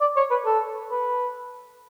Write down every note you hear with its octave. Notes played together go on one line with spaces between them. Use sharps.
D5
C#5
B4
A4
B4